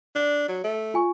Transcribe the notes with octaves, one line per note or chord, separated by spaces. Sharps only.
D4
F#3
A3
F4 G#5 C#6